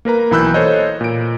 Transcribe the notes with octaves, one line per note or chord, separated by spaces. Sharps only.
A#3 A#4 B4 A#5
B1 E3 B5 E6 F#6 G6
A4 C5 C#5 D#5
A#2 D7